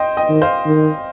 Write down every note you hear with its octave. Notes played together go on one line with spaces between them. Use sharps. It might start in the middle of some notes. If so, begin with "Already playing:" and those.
Already playing: C5 D#5 G5
D#5 G5
D#3
C5 F5
D#3